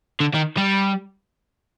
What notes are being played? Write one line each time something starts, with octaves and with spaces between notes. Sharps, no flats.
D3
D#3
G3